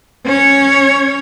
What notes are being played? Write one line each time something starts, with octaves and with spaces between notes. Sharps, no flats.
C#4 C#5